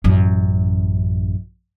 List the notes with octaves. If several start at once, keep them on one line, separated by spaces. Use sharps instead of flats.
A1 F#2